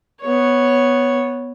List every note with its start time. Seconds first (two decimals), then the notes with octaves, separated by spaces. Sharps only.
0.21 B3 C#5